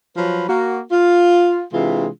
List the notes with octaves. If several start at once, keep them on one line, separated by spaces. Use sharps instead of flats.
F3 F#3 B4
A#3 F#4
F4
C3 E3 G#3 D4 F4